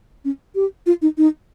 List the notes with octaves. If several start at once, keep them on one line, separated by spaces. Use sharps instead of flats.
C#4
G4
F4
D#4
D#4